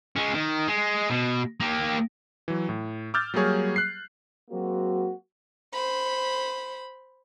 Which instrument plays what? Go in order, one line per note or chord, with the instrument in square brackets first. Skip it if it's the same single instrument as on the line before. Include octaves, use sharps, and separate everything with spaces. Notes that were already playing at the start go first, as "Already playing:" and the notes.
[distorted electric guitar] G#3 C#4
D#3
G#3
B2
A#3 G4
[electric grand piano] E3 F#3
A2
D6 E6 F6 G6 A6
F#3 G3 A#3 G#4 C#5
F#6 C7
[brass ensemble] F#3 G#3 A#3 C4 F#4
[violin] C5 B5